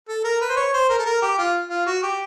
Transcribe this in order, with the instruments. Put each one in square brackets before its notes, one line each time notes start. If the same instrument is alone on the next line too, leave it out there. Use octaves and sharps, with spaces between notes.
[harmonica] A4
A#4
B4
C5
C#5
C5
A#4
A4
A#4
G4
F4
F4
F#4
G4